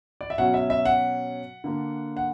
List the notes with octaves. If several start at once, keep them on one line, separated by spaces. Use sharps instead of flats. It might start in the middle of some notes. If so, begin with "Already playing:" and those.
D5
E5
B2 F#3 C#4 F#5
E5
E5
F#5
D3 A#3 D4
F#5